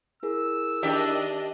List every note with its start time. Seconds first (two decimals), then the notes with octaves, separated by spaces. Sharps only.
0.23 E4 G#4 A#4 E6
0.83 D#3 D4 G4 D#5 E5